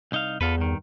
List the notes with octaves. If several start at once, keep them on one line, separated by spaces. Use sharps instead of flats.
C2 D#4 F5
E2 F4 A4 B4
G2 D#3